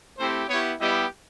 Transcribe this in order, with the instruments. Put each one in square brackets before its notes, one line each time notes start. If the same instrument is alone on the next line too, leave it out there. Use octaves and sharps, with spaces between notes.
[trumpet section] A3 C4 E4 G4 C5
B3 E4 G4 C#5
G3 B3 E4 G4 D#5